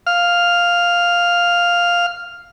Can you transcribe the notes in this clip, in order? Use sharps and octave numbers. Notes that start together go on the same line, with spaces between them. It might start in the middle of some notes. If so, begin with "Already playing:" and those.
F5 F6